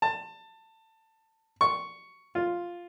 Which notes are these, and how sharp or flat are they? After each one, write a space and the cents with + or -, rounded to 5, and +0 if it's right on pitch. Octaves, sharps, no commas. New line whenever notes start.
A5 +20
C#6 +5
F4 +0